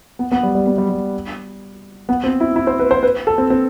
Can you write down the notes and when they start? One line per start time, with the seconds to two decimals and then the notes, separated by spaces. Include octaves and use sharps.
0.19 B3
0.32 B3
0.43 G3
0.55 G3
0.67 B3
0.78 G3
0.90 G3
2.09 B3
2.24 C4
2.40 E4
2.56 E4
2.67 C5
2.79 B4
2.91 C5
3.03 B4
3.27 A4
3.38 C4
3.50 C4